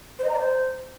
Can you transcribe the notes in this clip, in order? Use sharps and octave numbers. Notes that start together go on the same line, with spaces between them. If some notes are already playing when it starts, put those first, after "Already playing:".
C5
D#5
A#5
D5
C5